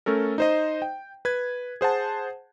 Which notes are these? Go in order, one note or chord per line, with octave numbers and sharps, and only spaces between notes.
A3 C#4 A4 A#4
D#4 C5 D#5
G5
B4 G#6
G#4 C5 F#5 A5